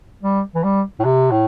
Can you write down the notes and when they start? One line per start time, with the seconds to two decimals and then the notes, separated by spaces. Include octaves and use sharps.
0.23 G3
0.55 E3
0.64 G3
1.00 A2
1.05 C3
1.32 A2